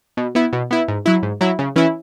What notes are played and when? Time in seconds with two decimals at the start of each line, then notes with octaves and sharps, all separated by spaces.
0.17 B2
0.35 B3 E4
0.53 B2
0.71 B3 E4
0.88 G#2
1.06 F#3 E4
1.23 G#2
1.41 F#3 E4
1.59 C#3
1.76 E3 C#4 E4